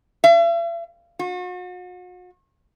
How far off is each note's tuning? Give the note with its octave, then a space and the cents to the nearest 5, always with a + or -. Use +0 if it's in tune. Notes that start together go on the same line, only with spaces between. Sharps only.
E5 +45
F#4 -40